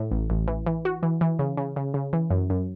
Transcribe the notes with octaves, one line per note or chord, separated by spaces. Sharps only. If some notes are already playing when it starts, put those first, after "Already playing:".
Already playing: A2
A1
A1
E3
E3
F#4
E3
E3
C#3
C#3
C#3
C#3
E3
F#2
F#2